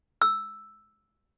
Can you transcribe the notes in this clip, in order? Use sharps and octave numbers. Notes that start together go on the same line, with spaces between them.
E6